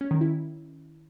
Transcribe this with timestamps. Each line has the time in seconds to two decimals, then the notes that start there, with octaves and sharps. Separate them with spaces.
0.01 C#4
0.11 D#3
0.21 E4